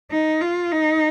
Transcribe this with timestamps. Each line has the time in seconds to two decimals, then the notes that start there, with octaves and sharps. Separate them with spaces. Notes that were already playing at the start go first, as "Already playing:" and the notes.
0.11 D#4
0.41 F4
0.72 D#4